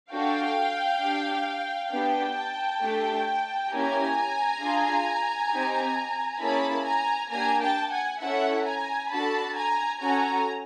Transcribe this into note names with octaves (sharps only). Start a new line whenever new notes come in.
D4 F#4 A4 F5 G5
D4 G4
B3 D4 G4 G5 A5
A3 D4 G4
A#3 C#4 E4 G4 G#5 A#5
D4 F4 G#4
C4 D#4 G4
A#3 C#4 E4 G#4 A5 B5
G#5 A#5
A#3 D4 G4 G#5 A#5
G5 A5
F#5 G#5
C#4 E4 A4 E5 F#5
G#5 A#5
D4 F#4 A4 A5 B5
G#5 A#5
C#4 F#4 A4 G#5 A#5